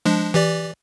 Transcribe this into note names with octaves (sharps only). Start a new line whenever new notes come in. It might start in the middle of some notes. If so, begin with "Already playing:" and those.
F3 G#3 D4
E3 G4 D5